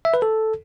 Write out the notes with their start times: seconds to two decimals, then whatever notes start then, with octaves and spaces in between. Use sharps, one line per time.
0.05 E5
0.14 B4
0.22 A4